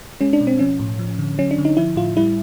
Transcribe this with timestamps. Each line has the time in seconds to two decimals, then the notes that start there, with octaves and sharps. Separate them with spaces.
0.21 G#3 C#4
0.33 D4
0.41 B2
0.47 C4
0.59 F3 C#4
0.80 A2
0.99 F3
1.19 D3
1.38 F#3 C#4
1.51 D4
1.58 D3
1.65 D#4
1.77 F3 E4
1.96 A2 F4
2.17 G3 E4